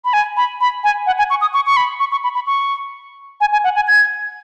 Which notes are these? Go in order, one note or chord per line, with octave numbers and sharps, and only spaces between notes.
B5
G#5
B5
B5
G#5
F#5
G#5
C#6
D#6
C#6
C#6
B5
C#6
C#6
B5
B5
C#6
G#5
G#5
F#5
G#5
G#6